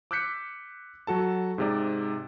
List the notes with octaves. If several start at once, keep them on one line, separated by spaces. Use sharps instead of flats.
D6 E6 F#6 G6 B6 C#7
F#3 F#4 A4 A5
G#2 C3 D5